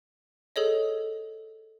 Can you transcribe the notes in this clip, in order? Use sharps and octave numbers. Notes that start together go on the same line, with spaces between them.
G#4 A4 C#5 D#5